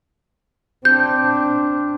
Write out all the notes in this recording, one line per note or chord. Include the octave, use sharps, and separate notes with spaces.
C4 D4 G6